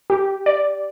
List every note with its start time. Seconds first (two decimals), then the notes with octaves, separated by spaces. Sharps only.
0.10 G4
0.46 D5